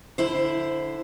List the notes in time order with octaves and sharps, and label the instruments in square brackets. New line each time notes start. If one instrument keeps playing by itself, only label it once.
[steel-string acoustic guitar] D3 E4 C5